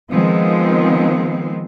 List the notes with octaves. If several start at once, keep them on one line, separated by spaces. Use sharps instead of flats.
D#3 F3 G#3 B3 C4